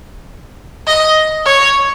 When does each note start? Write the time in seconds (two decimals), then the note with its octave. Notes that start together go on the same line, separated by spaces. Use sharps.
0.87 D#5
1.46 C#5